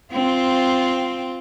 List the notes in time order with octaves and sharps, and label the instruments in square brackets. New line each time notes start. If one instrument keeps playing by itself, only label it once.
[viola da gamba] C4 F4